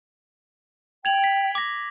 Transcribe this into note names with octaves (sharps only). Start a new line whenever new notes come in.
G5 G#6 F7 F#7
B6
D6 A#6